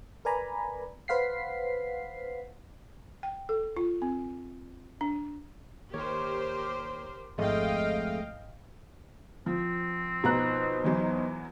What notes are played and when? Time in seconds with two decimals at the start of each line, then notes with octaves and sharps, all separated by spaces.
0.25 A#4 B4 D5 G#5 A#5 B5
1.08 B4 C5 F5 F#5 B6 C7
3.23 G5
3.49 A4
3.77 F4
4.02 C4
5.01 D4
5.94 D#2 G4 A#4 C5 C#5
7.38 G#1 F2 G#3 A3 D#5 F5 G5
9.46 F3 C4
10.24 B2 D#4 C5 A#5 F#6
10.84 E2 E3 F#3